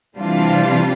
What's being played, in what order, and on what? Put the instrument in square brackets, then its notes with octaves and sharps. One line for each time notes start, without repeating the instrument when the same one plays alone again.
[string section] C3 E3 G3 D4 F4